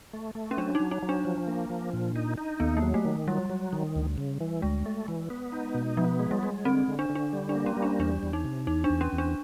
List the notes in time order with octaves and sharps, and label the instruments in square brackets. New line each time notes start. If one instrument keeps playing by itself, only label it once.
[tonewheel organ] A3
A3
[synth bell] C#4
[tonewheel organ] F#3 [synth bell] D4
[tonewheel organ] F#3 [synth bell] D#4
[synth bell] D#4
[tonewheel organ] F#3
[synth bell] D4
[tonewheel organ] F3
A#3
F3
A#2
D#4
D#4
[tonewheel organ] D#2 [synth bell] B3
[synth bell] A#3
[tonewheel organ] F#3
[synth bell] A3
[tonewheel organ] D#3
[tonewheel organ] F#3 [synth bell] G3
[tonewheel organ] F#3
D#3
D2
C#3
E3
[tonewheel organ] D2 [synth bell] G#3
[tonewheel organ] A3
E3
B3
D#4
B2
[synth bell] F3 [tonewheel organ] B3
[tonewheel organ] G#3
[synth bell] G3
[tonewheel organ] G#3
[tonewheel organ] D3 [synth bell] C4
[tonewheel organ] D3
[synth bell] D4
[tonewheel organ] D3
[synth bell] D4
[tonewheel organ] G3
[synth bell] D4
[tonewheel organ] A#3
[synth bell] C#4
[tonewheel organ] G3
[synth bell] D4
[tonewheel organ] E2 [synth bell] D4
[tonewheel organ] E2
[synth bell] D#4
[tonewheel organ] C3
[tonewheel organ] E2 [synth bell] D#4
[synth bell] D4
[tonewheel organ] E2
[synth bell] C#4
[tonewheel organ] E2
[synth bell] D4